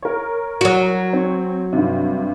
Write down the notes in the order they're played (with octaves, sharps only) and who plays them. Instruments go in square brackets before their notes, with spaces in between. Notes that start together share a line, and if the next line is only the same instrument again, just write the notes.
[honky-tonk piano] A#4 C#5
[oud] F#3 F#4
[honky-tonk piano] C4 C#5
G2 C3